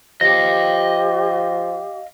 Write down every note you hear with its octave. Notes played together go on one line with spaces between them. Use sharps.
F3 G4 D#5 F5 A#6